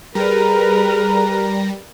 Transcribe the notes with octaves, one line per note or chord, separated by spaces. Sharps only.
G3 G#4 A#4 B4 A#5